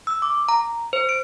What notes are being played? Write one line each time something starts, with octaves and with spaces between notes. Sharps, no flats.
E6
D6
A#5
C5
D7